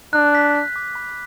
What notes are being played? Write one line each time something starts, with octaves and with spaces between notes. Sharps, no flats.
D4 F#6
B6
F#6
D6
B5